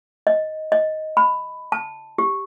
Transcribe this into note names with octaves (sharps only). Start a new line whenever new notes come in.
D#5
D#5
B5
A5
G4